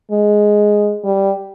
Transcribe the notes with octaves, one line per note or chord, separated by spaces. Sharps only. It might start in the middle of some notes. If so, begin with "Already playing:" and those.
G#3
G3